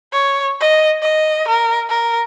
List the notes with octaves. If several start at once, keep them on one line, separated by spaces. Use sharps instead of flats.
C#5
D#5
D#5
A#4
A#4